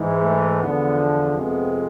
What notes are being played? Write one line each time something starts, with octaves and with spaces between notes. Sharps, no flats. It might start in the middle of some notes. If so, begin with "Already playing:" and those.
Already playing: G#2 E3 G#3
A3
E2 D3 F3 B3
F2 C3 G#3 B3